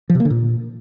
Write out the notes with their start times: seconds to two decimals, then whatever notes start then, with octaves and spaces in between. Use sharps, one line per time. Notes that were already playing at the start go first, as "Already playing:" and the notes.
0.10 F3
0.15 C3
0.20 A#3
0.25 D3
0.30 A#2